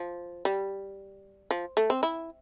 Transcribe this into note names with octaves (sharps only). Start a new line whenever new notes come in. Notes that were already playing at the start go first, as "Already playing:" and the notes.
Already playing: F3
G3
F3
A3
C4
E4